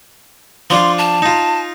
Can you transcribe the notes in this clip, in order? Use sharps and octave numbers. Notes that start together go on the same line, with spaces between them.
F3 D4 F4 C6
A5
D#4 F4